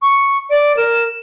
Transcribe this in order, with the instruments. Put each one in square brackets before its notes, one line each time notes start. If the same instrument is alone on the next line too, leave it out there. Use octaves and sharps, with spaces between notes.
[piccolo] C#6
[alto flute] D5 [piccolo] D7
[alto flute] A#4 [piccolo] E7